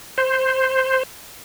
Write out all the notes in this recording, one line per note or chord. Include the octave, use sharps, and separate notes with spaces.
C5